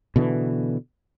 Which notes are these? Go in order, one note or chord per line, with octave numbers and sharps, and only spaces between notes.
B2 D3 E3